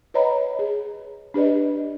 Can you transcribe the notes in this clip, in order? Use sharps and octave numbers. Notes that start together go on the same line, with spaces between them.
B4 C#5 D#5 F#5 A#5 B5
G#4
D4 G4 B4 D5 D#5